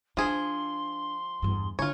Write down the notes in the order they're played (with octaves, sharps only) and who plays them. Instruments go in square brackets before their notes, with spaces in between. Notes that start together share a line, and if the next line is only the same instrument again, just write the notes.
[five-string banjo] F3 G#4 [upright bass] D4 [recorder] C6
[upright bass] E2 G2
[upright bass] D3 [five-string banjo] F4 C#5 [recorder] G#5